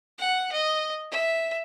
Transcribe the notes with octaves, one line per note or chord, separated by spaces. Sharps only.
F#5
D#5
E5